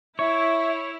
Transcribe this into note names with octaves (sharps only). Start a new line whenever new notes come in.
E4 C#5 E5